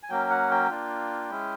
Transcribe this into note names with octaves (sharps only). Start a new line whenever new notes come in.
G#5
F#3 A#3 C#4 G5
F#5
G5
A#3 D4 F4
G#3 C#4 E4